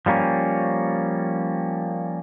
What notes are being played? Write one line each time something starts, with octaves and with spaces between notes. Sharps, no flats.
F3 G3 A#3 C#4